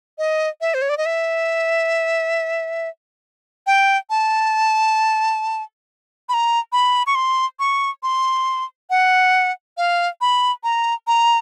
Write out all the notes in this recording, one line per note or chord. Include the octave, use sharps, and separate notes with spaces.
D#5
E5
C5
C#5
D5
D#5
E5
G5
A5
B5
A#5
B5
C#6
C6
C#6
C6
F#5
F5
B5
A#5
A#5